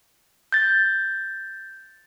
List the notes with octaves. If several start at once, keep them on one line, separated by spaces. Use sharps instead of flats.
G6 A6